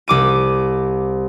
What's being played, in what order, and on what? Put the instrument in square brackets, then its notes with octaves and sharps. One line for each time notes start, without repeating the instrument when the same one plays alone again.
[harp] C2 D6 D#7